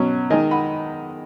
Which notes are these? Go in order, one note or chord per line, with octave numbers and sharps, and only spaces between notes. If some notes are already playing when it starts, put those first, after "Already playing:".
Already playing: B2 F#3 C#4 C#5
D#3 G#3 D#4 D#5 G#5
F#5 B5